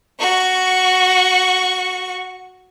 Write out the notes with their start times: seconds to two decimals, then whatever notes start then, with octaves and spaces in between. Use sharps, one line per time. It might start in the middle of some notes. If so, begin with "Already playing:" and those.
0.20 F#4 C#6